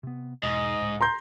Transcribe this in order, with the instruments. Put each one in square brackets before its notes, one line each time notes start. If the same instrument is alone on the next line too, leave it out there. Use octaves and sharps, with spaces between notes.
[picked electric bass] C3 B3
[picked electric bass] E2 B2 [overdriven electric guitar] G#2 [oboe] D#5
[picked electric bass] C#2 A2
[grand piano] A#5 C6 G6